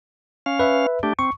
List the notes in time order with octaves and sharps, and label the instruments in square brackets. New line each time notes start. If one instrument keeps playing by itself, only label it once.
[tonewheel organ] C#4 F5
[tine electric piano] B4 E5
[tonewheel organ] A3 D4 G4
[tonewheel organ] C4 [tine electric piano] C#6